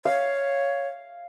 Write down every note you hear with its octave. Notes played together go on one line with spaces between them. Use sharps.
C#5 F5